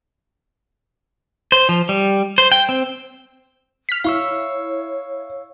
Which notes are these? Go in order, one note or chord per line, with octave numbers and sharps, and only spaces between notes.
C5
F3
G3
C5
G5
C4
F6 B6
E4 C#5 F5 C#6 E6